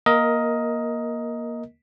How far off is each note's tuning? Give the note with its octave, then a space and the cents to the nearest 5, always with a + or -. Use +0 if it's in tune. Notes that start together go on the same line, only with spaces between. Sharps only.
A#3 +20 A#4 +0 D#5 +15